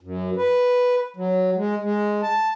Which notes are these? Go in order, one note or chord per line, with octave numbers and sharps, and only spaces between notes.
F#2
B4
F#3
G#3
G#3
A5